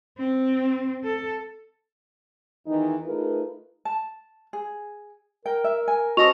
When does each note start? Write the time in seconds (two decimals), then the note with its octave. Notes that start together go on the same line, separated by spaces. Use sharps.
0.18 C4
1.04 A4
2.67 E2 D#3 E3 D#4
3.04 A3 D#4 F4 G#4 A#4 B4
3.85 A5
4.53 G#4
5.46 A#4 G5
5.64 E5
5.88 G#5
6.17 C#4 F#4 A4 C5 D#5 C#6 F7